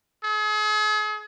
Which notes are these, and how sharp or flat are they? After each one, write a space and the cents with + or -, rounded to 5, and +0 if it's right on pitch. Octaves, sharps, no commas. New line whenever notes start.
G#4 +40